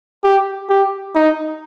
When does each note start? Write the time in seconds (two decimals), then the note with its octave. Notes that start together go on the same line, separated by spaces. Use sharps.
0.24 G4
0.69 G4
1.15 D#4